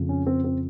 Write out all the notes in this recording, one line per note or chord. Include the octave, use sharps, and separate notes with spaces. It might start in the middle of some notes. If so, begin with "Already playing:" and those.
Already playing: F2 C#3 F3
C#4
C4
C4